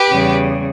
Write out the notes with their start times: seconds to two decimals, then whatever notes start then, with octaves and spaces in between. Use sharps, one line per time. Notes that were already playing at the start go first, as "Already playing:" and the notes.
Already playing: G4 B4
0.09 E2 C#3 G3